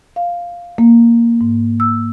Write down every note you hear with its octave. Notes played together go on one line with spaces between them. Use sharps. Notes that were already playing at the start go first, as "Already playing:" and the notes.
F5
A#3
G#2
E6